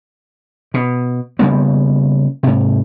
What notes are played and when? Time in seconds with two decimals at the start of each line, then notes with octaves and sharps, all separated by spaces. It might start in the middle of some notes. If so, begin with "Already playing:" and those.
0.74 B2
1.39 C#3 G3 A#3 B3
2.43 G#2 C3